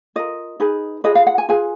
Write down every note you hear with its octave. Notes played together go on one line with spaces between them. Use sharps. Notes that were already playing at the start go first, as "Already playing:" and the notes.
F4 A#4 D#5
D#4 G#4 B4
F4 G#4 B4 D#5
F5
F#5
G#5
F4 G#4 B4 G#5